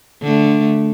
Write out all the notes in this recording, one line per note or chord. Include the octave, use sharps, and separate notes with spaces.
D3 A3